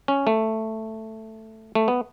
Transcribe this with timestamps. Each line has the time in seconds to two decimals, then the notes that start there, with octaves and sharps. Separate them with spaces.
0.08 C#4
0.27 A3
1.75 A3
1.88 B3